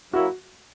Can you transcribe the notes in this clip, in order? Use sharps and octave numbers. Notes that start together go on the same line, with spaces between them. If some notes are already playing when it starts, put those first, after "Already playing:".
F#3 A#3 C#4 E4 F#4